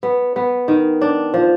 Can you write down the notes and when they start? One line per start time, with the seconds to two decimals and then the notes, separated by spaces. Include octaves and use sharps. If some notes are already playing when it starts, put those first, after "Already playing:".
0.03 B3
0.36 B3
0.68 D#3
1.01 D4
1.34 F3